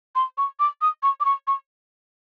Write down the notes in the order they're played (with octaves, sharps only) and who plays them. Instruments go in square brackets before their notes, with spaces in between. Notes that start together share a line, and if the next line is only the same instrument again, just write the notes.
[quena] C6
C#6
D6
D#6
C#6
D6
C#6
C#6